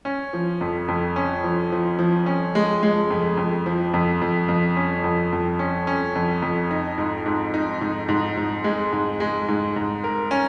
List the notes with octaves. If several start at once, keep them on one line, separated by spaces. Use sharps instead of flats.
C#4
F3
F2
F2
C#4
F3
F3
F3
C#4
G#3
G#3
F2
F2
F3
F2
F2
F2
C#4
F2
F2
C#4
C#4
F2
F2
D#4
G#2
G#2
D#4
G#2
G#2
G#2
G#3
G#2
G#3
G#2
G#2
A#4
C#4